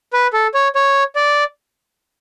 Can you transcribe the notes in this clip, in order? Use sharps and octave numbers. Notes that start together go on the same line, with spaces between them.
B4
A4
C#5
C#5
D5